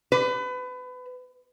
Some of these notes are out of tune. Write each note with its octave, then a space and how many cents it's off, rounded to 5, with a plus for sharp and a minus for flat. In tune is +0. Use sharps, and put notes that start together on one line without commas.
B4 +30